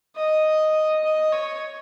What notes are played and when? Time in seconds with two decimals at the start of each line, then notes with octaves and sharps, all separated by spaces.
0.16 D#5
1.03 D#5
1.33 C#5